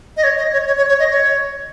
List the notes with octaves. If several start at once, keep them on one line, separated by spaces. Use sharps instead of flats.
D#5
C#5
D#5
C#5
C#5
C#5
C#5
D#5
C#5